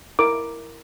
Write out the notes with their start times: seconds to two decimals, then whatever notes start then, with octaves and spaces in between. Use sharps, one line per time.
0.19 E4 A#4 D6